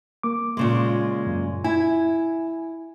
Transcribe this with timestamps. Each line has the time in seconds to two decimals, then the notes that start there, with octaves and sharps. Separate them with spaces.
0.23 A#3 D6
0.57 A#2 C#3 G#3
1.27 F#2
1.64 E4 G#5